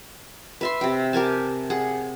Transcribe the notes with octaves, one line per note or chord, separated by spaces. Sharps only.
B4 E5 C6
C3 G5
G4 A#4 G#5 A5
G#4 F#5